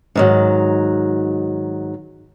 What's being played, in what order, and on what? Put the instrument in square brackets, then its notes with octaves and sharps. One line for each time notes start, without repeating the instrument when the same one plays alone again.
[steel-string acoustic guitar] G#2 D#3 F#3